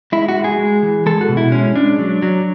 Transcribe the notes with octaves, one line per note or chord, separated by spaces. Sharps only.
G#3 E4
F#4
G#3
G#4
G#3
E3
G#3 A4
F#4
B2
E4
G#3 C#4
G#3 D4
F#3
F#3